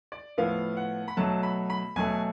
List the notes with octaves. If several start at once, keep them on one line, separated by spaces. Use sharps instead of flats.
D5
A2 F3 B3 F5
F#5
B5
B2 F#3 A3 A5
B5
B5
B2 F#3 A3 G#5